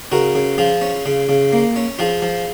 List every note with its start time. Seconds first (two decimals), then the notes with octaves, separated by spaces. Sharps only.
0.12 C#3 F#4 A#4
0.35 C#3
0.58 F3 F4 G#4
0.82 C#4
1.06 C#3
1.29 C#3
1.52 A#3
1.76 C#4
1.99 F3 F4 G#4
2.22 F3